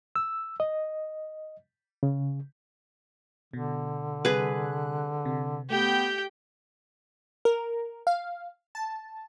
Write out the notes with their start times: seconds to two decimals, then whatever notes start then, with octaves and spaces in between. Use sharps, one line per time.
0.16 E6
0.60 D#5
2.03 C#3
3.53 B2 D3
4.25 C3 G3 G#4 B4 F#6
5.25 C3
5.70 A3 B3 G4 G5
7.45 A#4
8.07 F5
8.75 A5